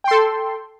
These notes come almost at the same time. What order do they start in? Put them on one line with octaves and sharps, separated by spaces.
G5 C6 A4